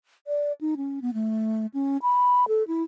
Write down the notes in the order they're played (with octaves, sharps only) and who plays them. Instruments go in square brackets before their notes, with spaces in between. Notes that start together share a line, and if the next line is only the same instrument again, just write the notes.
[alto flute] D5
D#4
C#4
B3
A3
C#4
B5
A4
E4